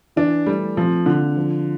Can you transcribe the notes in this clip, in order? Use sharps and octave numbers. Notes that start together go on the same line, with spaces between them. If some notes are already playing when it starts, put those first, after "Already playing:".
E3 D4
G3 A3
F3 C4
D3 F4
F3